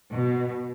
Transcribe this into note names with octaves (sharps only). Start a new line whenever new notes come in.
B2